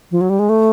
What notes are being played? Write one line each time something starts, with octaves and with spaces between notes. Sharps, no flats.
F3
F#3
G3
G#3
A3